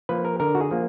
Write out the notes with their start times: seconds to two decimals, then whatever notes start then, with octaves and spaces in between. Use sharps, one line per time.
0.09 F3 A#3 B4
0.25 A#4
0.40 D3 A#4
0.55 F#4
0.61 G#4
0.71 F3 A#3